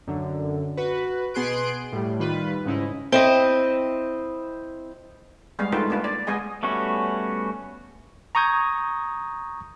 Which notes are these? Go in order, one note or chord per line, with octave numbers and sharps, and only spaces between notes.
F#2 D3
F#4 B4
B2 B3 G#4 C6 F#6 D7
A2 G3
D#3 G3 F4 B4
G#2 C#3 D#4 E4
C4 E4 D#5
G3 G#3 B3 F5
A3 D#4 F4 F#4 B4 G5
A#3 D4 F4 B4
D5
G#3 B3 G#4 D#5 G#5
G3 A3 B3 C#4 F#4
A#5 C#6 D#6 G6 G#6